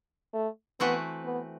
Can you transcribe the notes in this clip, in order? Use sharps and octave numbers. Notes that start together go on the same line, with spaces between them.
A3
E3 A3 B3 C4 F#4 B4
B3